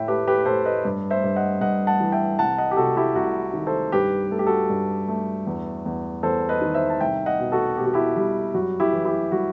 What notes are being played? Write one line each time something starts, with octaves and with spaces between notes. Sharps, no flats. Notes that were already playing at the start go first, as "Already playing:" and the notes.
Already playing: A2 E5 G5
A3 G4 B4
G4 B4
A2 A4 C5
B4 D#5
G2
C5 E5
G2
D#5 F#5
G2 D#5 F#5
F#5 A5
E3
E5 G5
C2 F#5 A5
D#5 F#5
G4
C3 F#4 A4
E4 G4
C2 F#4
D#3
A4 C5
G2 G4 B4
A3 A4
G4
F#4 A4
G2
A3
E2
E2
E2 A4 C5
B4 D#5
D#3
C5 E5
A5
C2 E5 G5
D#5 F#5
B2
F#4 A4
B2 G4
F#4
E4 G4
G3
F#2 F#4
E4 G4
E3
E4 G4
G3 F#4